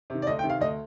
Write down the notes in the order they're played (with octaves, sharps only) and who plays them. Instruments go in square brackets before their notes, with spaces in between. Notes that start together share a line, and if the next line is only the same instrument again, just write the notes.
[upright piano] C3 D#3
D5
D2 D#5
G5
C3 D#3
F5
D2 D#5